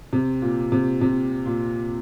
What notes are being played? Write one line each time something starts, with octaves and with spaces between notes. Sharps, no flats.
C3
A#2
C3
C3
A#2